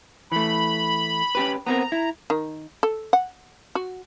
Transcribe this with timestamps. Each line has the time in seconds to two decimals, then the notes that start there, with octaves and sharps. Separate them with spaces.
0.32 E3 A3 B5
1.35 C#4 G4 B4
1.67 B3 C4 A#4 A#5
1.92 E4
2.30 D#3
2.83 A4
3.13 F#5
3.75 F#4